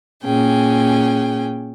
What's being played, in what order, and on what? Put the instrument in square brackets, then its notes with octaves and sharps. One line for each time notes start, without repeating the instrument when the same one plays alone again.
[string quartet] A#2 C#4 G#4 G5